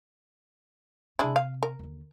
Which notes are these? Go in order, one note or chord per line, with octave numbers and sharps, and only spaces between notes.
C3 G#3 C4 D4 E4
F5
A#4
D#2 D3